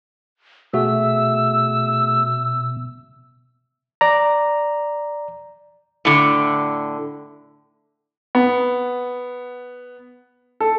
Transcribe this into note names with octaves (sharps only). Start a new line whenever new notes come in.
B2 A3 F#4 G#4 E5 E6
D5 A#5
A2 D3
B3
A4